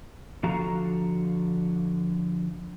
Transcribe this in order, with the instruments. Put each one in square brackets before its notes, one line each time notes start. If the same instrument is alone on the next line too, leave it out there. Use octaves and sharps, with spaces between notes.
[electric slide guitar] D3 F3 F#4 A4 F5 A#5